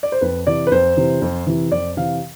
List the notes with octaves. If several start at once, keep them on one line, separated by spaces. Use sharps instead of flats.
D5
C5
F2 B4
C3 E3 D5
B4
F2 C5
C3 E3
F2
C3 E3
F2 D5
C3 E3 F5